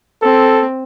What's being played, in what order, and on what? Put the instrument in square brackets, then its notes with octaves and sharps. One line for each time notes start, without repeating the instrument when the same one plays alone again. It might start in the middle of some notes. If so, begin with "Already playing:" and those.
[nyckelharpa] C4 [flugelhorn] A4